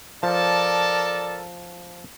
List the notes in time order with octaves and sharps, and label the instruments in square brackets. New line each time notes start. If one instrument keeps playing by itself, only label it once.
[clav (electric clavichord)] F3 [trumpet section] A4 A#4 A5 [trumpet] D5